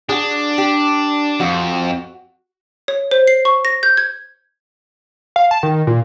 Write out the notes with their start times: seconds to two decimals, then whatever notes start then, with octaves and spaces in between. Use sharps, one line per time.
0.09 D4 F#4 G#4
0.58 G4
1.40 F2 F#4
2.88 C#5
3.11 C5
3.28 C7
3.45 C#6
3.65 A#6
3.83 G6
3.97 G#6
5.36 F5
5.51 A5
5.63 D#3
5.87 A#2